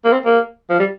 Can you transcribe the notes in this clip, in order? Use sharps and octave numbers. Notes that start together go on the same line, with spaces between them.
A#3
C4
A#3
F3
G3